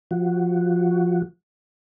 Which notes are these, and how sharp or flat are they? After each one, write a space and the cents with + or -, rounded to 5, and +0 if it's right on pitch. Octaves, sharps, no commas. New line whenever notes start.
F3 +5 F#4 +0